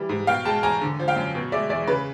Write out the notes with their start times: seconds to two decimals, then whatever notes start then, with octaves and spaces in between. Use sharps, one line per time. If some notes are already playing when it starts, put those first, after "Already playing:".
Already playing: E3 G3
0.09 G#2
0.27 B2 F5 G5
0.45 G#3 G5 A5
0.63 E2 G#5 A#5
0.81 D3
0.99 F3
1.08 F5 G5
1.16 F#2
1.35 B2
1.52 G#3 D5 E5
1.69 E2 D5 E5
1.88 C#3 B4